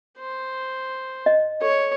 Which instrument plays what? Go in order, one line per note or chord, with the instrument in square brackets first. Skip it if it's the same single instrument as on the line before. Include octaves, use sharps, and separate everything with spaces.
[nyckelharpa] C5
[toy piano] D#5
[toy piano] A4 [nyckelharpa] C#5